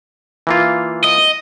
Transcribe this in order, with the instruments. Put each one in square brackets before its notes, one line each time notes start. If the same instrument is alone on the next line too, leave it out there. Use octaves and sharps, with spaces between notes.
[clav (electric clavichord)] E3 A#3 F4
[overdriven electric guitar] D#5